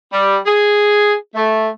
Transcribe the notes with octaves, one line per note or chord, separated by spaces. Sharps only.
G3
G#4
A3